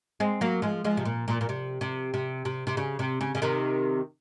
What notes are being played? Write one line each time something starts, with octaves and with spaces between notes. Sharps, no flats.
G#3 C4
F#3 A#3
F3 G#3
F3 G#3
C3
A#2
A#2
A#2
C3
C3
C3
C3
C3
C#3
C3
C#3
C#3
C3 D#3